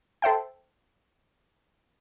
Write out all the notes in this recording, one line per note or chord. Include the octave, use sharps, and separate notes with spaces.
A4 C5 E5 G5